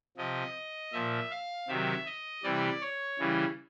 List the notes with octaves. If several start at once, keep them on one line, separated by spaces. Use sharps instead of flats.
C3 F3 D#5
A#2 F3 E5
F5
C3 D#3 F#3 E5
D#5
C3 E3 G3 D5
C#5
C#3 E3 G3